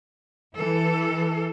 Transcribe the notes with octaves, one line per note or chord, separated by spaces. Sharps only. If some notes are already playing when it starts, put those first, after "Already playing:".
E3 A4